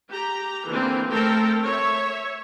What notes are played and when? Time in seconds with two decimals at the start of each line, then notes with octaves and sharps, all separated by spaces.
0.11 G4 A#5
0.68 D3 E3 A#3 C4
1.12 A3 C4 A4 A#4 G5
1.66 C#5 E5